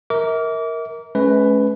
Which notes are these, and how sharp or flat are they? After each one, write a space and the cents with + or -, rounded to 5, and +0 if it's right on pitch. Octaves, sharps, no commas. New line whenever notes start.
A#4 +0 E5 -40 D6 -30
G#3 +45 C#4 +0 B4 +10